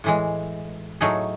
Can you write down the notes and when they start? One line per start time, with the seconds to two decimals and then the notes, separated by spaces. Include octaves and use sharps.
0.04 A2 E3 G#3
1.01 A2 F#3 A3 D#4 G#4